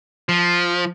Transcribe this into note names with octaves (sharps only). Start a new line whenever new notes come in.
F3